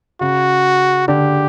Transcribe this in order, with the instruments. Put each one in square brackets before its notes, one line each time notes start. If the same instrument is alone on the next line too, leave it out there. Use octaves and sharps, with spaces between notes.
[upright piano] C#3 [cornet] F#4
[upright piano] D3 [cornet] G4